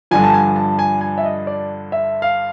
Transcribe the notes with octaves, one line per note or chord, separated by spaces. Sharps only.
G2 D3 F3 G#5
A5
G#5
A5
G#5
G#5
E5
D#5
D5
E5
F5